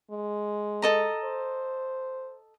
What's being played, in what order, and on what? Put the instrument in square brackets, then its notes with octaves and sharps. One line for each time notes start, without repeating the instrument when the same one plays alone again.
[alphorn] G#3
[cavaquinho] A4 D#5 A#5
[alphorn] C5